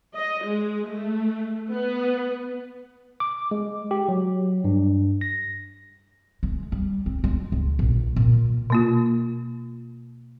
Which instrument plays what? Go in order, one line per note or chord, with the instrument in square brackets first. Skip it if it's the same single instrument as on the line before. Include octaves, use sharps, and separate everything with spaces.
[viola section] D#5
G#3
A3
B3
[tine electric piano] D6
G#3
G4
F#3
G2
A#6
[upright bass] G#3
G3
C4
G#3
C#2
A#1
A#2
[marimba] B2 A#3 F4